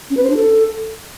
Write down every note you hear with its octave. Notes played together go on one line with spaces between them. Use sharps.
C#4
B4
C5
D4
A4